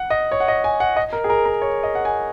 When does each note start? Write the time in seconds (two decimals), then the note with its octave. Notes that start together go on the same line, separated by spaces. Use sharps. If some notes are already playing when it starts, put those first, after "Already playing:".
Already playing: F#5
0.10 D#5
0.32 C#5
0.40 F#5
0.48 D#5
0.64 G#5
0.80 F#5
0.96 D#5
1.13 A#4
1.24 G#4
1.30 A#4
1.45 A#4
1.62 C#5
1.83 D#5
1.95 F#5
2.05 G#5